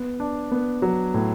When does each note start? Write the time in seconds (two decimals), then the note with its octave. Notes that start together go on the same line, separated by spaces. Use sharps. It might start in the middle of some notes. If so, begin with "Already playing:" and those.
Already playing: B3
0.20 D4
0.52 B3
0.82 F#3
1.14 A2